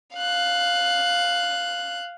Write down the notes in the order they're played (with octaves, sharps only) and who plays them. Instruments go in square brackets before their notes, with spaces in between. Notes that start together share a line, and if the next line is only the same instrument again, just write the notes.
[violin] F5 F#6